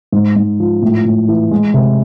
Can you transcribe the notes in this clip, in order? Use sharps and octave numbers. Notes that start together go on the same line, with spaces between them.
G#2
G#2
F3
A2
A2
E3
G#3
C3